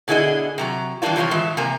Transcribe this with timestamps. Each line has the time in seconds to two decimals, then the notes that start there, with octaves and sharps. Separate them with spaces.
0.08 B2 D3 E4 G#4 D#5
0.58 C3 F#3 A#5
1.02 E3 G3 A#3 D4 D#4 F4
1.16 C3 E3 F3 F4 C#5
1.31 A2 E3 G#3 E5
1.57 C3 A#3 G#5 A#5